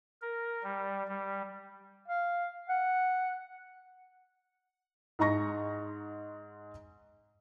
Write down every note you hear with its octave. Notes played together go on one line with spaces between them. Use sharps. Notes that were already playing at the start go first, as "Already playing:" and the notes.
A#4
G3
G3
F5
F#5
G#2 G#3 D#5 A#5 C#6 A#6